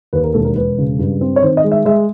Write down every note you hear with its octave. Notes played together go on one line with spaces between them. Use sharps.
D#2 B4
A#4
E1 A4
A#4
E1 B4
C#3
G2
C4
C#5
D#3 C5
D#5
G#3
E5
G#3 E5